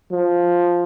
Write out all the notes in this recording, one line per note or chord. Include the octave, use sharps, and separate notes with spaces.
F3